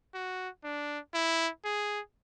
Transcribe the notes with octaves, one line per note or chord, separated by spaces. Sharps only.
F#4
D4
E4
G#4